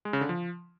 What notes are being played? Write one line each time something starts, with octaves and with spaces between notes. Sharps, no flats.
G#3
C#3
D3
F3